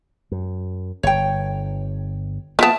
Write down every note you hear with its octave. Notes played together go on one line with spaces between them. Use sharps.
F#2
G1 C#5 G5
F3 A#3 B3 A#4 E5 A5